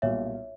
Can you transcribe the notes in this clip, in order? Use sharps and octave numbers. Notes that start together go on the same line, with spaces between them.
B1 A#2 G3 C#5 E5